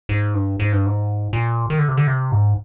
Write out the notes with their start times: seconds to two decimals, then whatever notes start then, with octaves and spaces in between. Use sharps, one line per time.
0.09 G#2
0.34 G2
0.60 G#2
0.72 G2
0.86 G#2
1.33 A#2
1.70 D#3
1.79 D3
1.88 C3
1.97 D3
2.07 C3
2.32 G#2